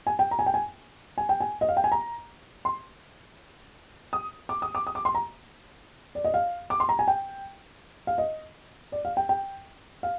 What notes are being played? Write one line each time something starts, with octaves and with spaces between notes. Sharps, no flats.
G#5
G5
A#5
G#5
G5
G#5
G#5
G5
G#5
D#5
F5
G5
G#5
A#5
C6
D#6
D6
D#6
D6
D#6
D6
C6
A#5
D5
D#5
F5
D6
C6
A#5
G#5
G5
F5
D#5
D5
F5
G5
G5
F5